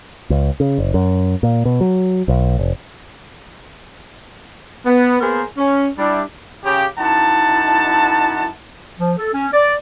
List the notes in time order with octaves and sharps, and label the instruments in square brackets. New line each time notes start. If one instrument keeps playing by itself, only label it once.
[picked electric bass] C#2
C#3
F#1
F#2
A#2
B2
F#3
B1
F1
[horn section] B3
A#3 B3 G#4 A#4 C5
C#4
G3 D4 E4
C#3 G4
F#2 D#4 E4 F#5 A5
[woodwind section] F3
A4
C#4
D5